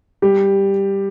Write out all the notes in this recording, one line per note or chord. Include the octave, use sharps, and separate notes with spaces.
G3 G4